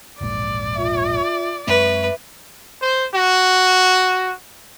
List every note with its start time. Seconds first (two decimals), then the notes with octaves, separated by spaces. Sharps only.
0.21 E1 A#1 G#2 D5
0.75 F4 E5
1.67 F#2 G#3 C4 B4 E5
2.81 C5
3.15 F#4